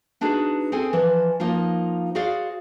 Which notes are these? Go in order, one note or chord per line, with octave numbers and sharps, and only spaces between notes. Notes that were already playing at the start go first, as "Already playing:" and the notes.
B3 D4 D#4 F#4 G#4
C4 G#4 A4 G#5
E3 F3
F3 A#3 D#4 F4
F#4 G#4 C5 D5 F5